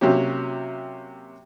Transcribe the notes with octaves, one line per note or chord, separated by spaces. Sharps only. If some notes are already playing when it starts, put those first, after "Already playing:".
C3 F#3 A#3 C#4 G4